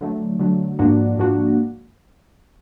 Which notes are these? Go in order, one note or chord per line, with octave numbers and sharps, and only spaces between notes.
D3 F#3 A3
D3 F#3 A3
G#2 F3 A#3 D4 F#4
G#2 F3 A#3 D4 F#4